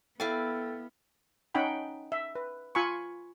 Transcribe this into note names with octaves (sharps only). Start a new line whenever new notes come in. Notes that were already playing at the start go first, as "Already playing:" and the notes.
B3 E4 A4 F5 G5 D6 A6
C#4 D#4 F#5 G5 B5
E5
B4
F4 G#5 B5 C#6